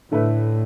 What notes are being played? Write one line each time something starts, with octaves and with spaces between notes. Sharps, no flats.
A2 D3 A3 E4 B4